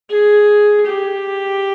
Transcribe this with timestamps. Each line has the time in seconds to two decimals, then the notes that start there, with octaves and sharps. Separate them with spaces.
0.10 G#4
0.87 G4